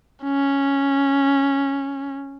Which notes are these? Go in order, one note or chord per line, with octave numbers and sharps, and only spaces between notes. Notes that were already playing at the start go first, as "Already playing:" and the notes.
C#4